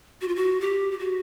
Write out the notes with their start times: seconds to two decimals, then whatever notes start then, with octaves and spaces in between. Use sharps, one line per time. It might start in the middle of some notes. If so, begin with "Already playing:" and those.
0.21 F#4
0.28 F4
0.36 F#4
0.61 G4
0.91 G4
0.99 F#4